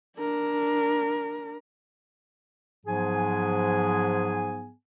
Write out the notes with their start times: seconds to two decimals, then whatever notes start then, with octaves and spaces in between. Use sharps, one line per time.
0.17 D4 A#4
2.86 G#2 F3 F#3 B3 G#4 G#5